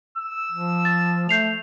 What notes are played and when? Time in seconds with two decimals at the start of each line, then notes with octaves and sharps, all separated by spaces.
0.18 E6
0.52 F3
0.85 A6
1.29 A3 G6 C7 F7